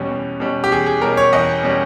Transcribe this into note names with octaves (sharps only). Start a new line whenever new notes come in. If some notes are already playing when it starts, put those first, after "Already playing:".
Already playing: E2 B2 G3 C#4
E2
B2 G3 C#4
G4
E2 G#4
G#4
B2 G3 C#4 A#4
C#5
E2 D#5
B2 G3 C#4